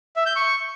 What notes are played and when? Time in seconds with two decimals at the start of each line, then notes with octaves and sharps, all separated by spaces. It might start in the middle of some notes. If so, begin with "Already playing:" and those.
0.16 E5
0.26 G6
0.36 C#6